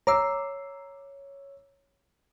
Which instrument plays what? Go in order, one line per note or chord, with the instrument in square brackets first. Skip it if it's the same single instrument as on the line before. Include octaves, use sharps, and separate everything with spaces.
[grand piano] C#5 E6 [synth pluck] A#5 D6 C7